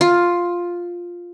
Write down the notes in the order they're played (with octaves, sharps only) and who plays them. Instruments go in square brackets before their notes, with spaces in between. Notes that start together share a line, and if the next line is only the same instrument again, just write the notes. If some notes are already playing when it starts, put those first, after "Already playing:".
[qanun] F4